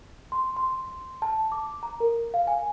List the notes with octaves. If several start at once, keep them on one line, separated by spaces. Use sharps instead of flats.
C6
C6
A5
D6
A#5
A#4
F5
G#5